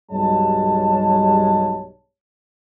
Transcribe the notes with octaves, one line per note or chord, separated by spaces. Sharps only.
B1 G2 G3 G#3 C#5 A5